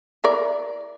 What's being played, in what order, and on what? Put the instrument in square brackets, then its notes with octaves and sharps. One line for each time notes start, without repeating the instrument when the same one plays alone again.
[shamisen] E4 A#4 D5